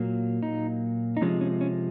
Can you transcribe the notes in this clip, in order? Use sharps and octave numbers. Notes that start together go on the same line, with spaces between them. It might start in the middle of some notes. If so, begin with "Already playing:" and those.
Already playing: A#2 F#3 A#3
D#4
D#4
C3 F3 G#3 C#4
C#4
C#4